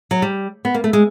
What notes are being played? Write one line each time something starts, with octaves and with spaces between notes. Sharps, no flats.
F#3
G3
B3
A#3
A3
G#3